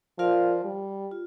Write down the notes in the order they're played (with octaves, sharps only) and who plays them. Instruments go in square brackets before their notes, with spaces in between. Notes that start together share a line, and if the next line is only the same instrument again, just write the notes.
[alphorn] F3 [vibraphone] F4 A#4 D5 F5
[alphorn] G3
[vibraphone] F4